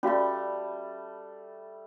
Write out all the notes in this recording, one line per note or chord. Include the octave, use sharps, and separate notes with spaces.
G3 A3 C#4 F#4 F5